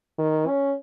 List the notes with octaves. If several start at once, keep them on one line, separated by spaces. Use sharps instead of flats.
D#3
C#4